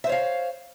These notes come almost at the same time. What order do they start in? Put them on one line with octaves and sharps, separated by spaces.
E5 C5 C#5 F5